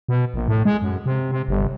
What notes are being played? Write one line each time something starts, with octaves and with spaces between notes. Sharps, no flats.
B2
A#1
A2
G#3
F#2
C3
C3
G1